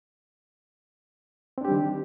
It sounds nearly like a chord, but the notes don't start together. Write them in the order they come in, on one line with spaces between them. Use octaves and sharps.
C4 D4 G4 G3 D#3